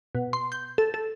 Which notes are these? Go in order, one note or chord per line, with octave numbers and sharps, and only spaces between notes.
B2
C6
G6
A4
A4